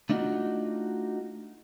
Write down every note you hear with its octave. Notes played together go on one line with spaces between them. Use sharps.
A3 D4 D#4 F4 F#4